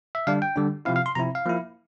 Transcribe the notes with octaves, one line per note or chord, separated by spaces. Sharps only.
E5
D3 G3 D4 F5
G5
D3 G3 D4
C3 F3 C4 E4 F5
F5
C6
C3 F3 C4 E4 A#5
F5
F3 A#3 E4